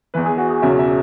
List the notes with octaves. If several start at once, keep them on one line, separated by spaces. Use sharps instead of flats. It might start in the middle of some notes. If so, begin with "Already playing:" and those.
E2 E3 B4
G#4
F#4
G#4
E1 E2 C#3 F#3 E5
E5